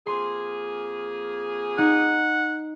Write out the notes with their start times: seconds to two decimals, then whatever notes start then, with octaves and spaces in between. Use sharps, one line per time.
0.07 F2 A#3 G#4 C6
1.78 D#4 F#5